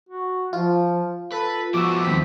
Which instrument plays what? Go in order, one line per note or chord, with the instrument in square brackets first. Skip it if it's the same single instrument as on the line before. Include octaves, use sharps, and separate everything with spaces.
[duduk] F#4
[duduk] F3 [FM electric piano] F4
[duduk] A4 [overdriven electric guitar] B4
[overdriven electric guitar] F3 B3 [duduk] F#4 [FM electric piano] D6 E6
[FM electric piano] D#2 B6 [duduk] C4